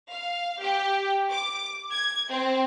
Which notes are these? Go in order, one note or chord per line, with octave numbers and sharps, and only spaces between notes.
F5
G4
D6
G#6
C4